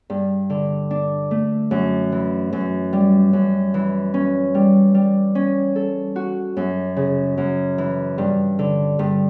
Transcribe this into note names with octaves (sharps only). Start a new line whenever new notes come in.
G2
D3
D4
A3
F#2
E3
F#2
G3
F#2
E3
C#4
G3
G3
C#4
A4
F#4
F#2
C#3
F#2
E3
G2
D3
G2